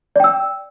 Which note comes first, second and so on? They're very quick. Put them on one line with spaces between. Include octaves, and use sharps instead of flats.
D5 G5 E6